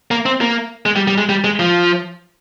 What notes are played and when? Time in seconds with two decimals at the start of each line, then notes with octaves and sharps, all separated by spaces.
0.11 A#3
0.26 C4
0.41 A#3
0.86 G#3
0.96 G3
1.07 G3
1.18 G#3
1.29 G3
1.44 G#3
1.59 F3